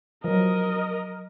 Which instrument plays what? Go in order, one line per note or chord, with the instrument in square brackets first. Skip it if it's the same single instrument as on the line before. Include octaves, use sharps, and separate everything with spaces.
[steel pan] F3 F#3 [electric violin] A#4 D#5